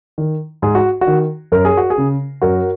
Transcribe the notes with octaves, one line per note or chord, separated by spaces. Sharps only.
D#3
G#2 G#4
F#4
F#4
D#3
F#2 A#4
G#4
F#4
G#4
C#3
F#2 F#4 A#4